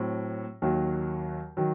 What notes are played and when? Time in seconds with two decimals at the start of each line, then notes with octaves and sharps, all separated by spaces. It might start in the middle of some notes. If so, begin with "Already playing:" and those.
Already playing: A2 F#3 C4
0.62 D#2 D#3 F#3
1.57 D#3 F#3